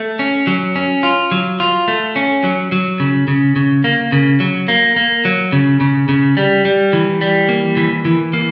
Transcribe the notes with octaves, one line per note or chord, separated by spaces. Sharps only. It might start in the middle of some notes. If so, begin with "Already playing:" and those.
Already playing: A3
C#4
F#3
C#4
F4
F#3
F4
A3
C#4
F#3
F#3
C#3
C#3
C#3
A#3
C#3
F#3
A#3
A#3
F#3
C#3
C#3
C#3
G3
G3
E3
G3
A#3
E3
E3
A#3